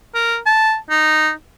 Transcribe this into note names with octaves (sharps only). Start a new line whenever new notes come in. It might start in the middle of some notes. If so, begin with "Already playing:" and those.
A#4
A5
D#4